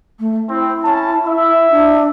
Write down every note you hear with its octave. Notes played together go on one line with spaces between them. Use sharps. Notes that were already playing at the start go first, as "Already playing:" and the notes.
A3
C4 E4
C#4 A5
E5
D4